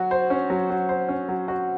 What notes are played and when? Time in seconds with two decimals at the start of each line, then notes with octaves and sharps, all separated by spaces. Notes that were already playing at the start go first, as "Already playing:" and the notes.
Already playing: F#3 F#4
0.11 C5
0.30 C#4
0.50 F#3
0.70 F#3
0.89 C5
1.08 C#4
1.29 F#3
1.48 F#4